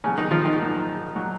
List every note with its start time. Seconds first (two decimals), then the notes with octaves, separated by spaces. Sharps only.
0.04 A#1 A#2 C#3 F#3 C#4
0.18 D#3 D#4
0.31 F3 F4
0.45 D#3 D#4
0.59 A#1 A#2 F#3
1.15 A#2 F#3